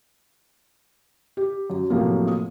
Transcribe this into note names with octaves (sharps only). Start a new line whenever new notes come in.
G4
F#2
A2 C3 F3 F#3 A#3
D#6